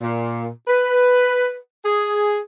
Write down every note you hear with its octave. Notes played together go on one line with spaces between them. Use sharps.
A#2
B4
G#4